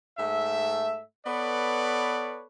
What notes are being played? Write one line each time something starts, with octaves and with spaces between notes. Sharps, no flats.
G#2 A3 E5
B3 A4 B4 C#5 D5